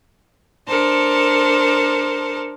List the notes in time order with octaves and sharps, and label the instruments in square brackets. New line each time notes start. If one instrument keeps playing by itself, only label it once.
[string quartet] D4 A4 A#4 C5 A5